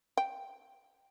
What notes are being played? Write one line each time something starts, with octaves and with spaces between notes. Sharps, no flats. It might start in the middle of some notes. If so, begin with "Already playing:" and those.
G5